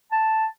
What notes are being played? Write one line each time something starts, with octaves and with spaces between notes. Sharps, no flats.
A5